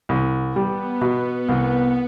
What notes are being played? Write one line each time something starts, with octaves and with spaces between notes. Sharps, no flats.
C2
G3 B3
B2
C2